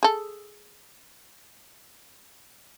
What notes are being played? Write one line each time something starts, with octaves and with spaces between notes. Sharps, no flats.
G#4 A4